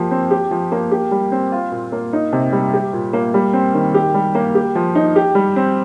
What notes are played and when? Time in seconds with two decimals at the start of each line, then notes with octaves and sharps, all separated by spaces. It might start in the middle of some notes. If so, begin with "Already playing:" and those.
Already playing: F3 A#3 G4
0.11 C4
0.31 G4
0.51 F3
0.72 A#3
0.91 G4
1.11 G3
1.32 C4
1.52 F4
1.71 A#2
1.92 A#3
2.13 D#4
2.33 C3
2.52 G3
2.74 G4
2.93 A#2
3.13 A#3
3.34 G3
3.53 C4
3.74 D#3
3.95 G4
4.14 G3
4.35 A#3
4.55 G4
4.75 F3
4.95 D#4
5.16 G4
5.35 G3
5.56 C4